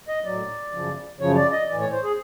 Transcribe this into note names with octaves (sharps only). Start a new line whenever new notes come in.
D#5
A2 F#3 D5
F#2 C#3 F3
F#2 C#3 F3 C#5
D5
D#5
A2 E3 D5
C#5
C5
G#4